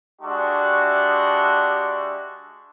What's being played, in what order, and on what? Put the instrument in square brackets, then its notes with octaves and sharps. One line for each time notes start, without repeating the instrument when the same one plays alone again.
[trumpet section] G#3 D4 F#4 G4 E5 C#6